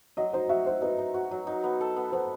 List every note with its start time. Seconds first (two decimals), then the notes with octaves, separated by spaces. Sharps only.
0.17 F#3 D#5
0.33 D#4 C5
0.49 F#4 E5
0.66 F#4 C5
0.82 D#4 B4
0.98 D#4
1.14 F#4
1.31 F#3
1.47 D#4
1.64 B3
1.81 A4
1.96 B3
2.12 B3 C5